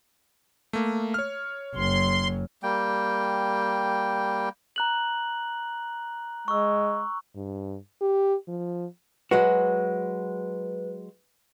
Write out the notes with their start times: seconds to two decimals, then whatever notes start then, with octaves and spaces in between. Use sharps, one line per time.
0.73 A3 A#3
1.14 C#5 F6
1.76 F#1 F#3 C6
2.63 G3 A#3 G5
4.76 A#5 F#6 F#7
6.48 G#3 C#6 E6
7.36 G2
8.01 G4
8.48 F3
9.31 F#3 G#3 F#4 B4